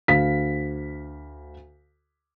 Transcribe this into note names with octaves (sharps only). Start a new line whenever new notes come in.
D2 F5 B6